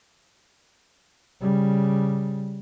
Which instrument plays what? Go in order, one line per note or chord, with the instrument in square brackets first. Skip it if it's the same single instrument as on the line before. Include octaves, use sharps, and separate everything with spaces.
[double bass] C#3 G3